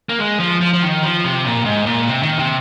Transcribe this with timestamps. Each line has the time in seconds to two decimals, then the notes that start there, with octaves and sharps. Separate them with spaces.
0.09 A#3
0.19 G#3
0.40 F3
0.61 F3
0.73 F3
0.83 D#3
1.03 F3
1.24 C3
1.45 A#2
1.65 G#2
1.86 A#2
2.08 C3
2.23 D#3
2.39 C3